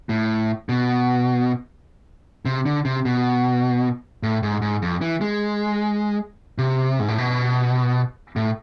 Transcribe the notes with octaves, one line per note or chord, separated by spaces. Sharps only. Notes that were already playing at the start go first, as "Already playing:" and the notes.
A2
B2
C3
D3
C3
B2
A2
G#2
G#2
F2
E3
G#3
C3
G#2
A2
B2
A2